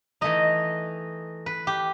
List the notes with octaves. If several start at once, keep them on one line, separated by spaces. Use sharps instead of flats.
E3 A3 D#4 D#5
B4
G4